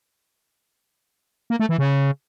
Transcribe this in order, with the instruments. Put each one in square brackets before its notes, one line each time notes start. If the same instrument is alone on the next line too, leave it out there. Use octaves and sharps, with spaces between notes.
[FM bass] A#3
A3
E3
C#3